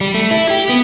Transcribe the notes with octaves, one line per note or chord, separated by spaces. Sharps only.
G3
A3
E4
G4
B3